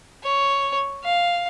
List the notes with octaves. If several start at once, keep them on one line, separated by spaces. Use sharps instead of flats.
C#5
F5